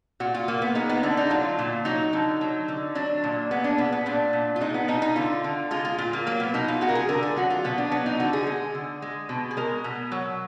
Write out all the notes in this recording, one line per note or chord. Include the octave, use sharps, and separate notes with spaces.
A#2 F#4
F4
A#2 A#3
B3
G#3 D#4
B3
D3 D4
D#4
F#3 F4
A#2
F#3 D#4
D3
F#3
D3
F#3 D4
A#2
G#3 B3
D4
B2 B3
B3
A#2 D4
A#2
F4
G#3 D#4
B3
B2 D#4
D#4
D3 F4
D3
G#3 F4
F4
A#2 F4
A#3
F#3 A#3
B3
B2 D#4
F4
G#3 F#4
A#4
G#4
D3 A#4
G#4
F#3 F#4
F4
B2 B3
D4
F#3 B3
D#4
D3 F#4
G#4
G#3
D3
G#3
B2
G#4
G#3 A#4
B2
F#3